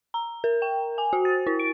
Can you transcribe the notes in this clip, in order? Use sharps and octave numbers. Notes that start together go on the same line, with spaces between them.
A#5
A#4
G5
G#5
F#4
A6
E4
D7